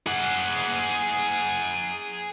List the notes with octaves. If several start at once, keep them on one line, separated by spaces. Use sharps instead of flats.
G#4 F#5